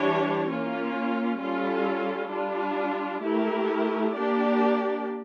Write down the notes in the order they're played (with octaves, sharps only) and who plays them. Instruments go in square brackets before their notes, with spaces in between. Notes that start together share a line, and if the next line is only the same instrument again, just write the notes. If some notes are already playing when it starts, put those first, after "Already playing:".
Already playing: [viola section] E3 G3 D4 G4 C#5
A#3 C#4 F4
G3 C#4 F4 A4
G3 D4 F4
A3 E4 G4 A#4
A#3 D4 G4 D5